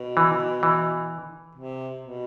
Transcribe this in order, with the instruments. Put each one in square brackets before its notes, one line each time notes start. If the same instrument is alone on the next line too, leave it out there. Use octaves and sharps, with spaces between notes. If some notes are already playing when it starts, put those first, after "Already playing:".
Already playing: [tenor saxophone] B2
[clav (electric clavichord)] E3
E3
[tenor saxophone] C3
B2